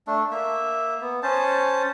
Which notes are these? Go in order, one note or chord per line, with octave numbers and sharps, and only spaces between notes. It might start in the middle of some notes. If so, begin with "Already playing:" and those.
A3 D4
A#3 E5
B3
C#4 C5 A5